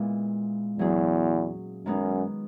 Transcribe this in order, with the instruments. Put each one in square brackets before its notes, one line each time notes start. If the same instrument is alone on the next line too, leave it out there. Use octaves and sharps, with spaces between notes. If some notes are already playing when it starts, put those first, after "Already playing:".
Already playing: [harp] A#2 G#3 B3 E4
[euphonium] E2 [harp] F#3 C#4 G#4
[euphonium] F#2 [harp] D#3 G#3 B3 D#4 G#4